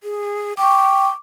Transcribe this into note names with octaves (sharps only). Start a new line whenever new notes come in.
G#4
G5 C#6 D6